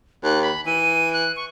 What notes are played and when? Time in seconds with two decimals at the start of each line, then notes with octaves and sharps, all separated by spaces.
0.23 D#2 F#6
0.42 B5
0.66 E3 D#7
1.13 F#6
1.36 C#6